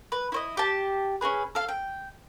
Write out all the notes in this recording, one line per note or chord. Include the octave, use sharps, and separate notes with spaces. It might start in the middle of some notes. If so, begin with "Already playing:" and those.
B4
E4 C5 D#5
G4 A5
C#4 D4 G#4 B4
A4 F5
G5